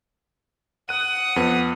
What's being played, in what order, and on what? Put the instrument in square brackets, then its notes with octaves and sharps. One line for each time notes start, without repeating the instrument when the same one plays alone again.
[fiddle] F#5 D#6 [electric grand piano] F#6 D#7
[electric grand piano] F2 B3